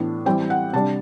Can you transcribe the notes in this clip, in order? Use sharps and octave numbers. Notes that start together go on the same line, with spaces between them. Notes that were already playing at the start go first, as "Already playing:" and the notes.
Already playing: A2 E3 B3 D4
E3 G3 C4 G5
F#5
C3 G3 D4 A5